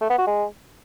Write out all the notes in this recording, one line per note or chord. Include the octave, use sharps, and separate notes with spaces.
A3
B3
F#4
G#3